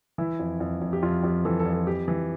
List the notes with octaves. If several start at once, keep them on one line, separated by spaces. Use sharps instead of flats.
E3 E4
F2
F2
F2
G4
F2 F4
F2 G4
E3 A4
A4
F2
A4
F2 G4
E3